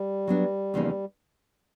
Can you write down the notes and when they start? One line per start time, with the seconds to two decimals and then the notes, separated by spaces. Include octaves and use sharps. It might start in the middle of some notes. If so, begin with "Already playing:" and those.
Already playing: G3
0.27 F#3 B3 D4
0.74 E2 C#3 F3 A#3 D#4